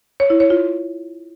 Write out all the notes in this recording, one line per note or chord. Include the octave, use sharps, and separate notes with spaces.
C#5
E4
C#5
F4